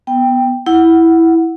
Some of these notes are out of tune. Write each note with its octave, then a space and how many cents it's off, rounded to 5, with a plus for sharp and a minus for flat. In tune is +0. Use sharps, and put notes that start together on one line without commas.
B3 +0 G5 +0
E4 +0 F#5 +0